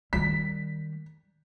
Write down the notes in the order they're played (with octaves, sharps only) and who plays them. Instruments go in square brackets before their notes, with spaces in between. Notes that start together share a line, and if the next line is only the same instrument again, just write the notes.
[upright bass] D#3 G3 [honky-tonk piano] B6